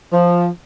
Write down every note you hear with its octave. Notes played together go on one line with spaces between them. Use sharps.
F3